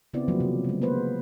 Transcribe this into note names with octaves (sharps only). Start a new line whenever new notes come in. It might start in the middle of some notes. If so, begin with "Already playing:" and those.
C#3 B3 C4 E4 D5
D#3 F3 F#3 A#3
C3
C#3 G#3
A#3 B3 B4 C5